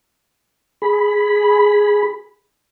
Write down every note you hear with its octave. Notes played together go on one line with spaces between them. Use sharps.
G#4 B5